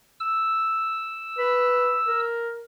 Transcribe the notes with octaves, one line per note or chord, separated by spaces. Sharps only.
E6
B4
A#4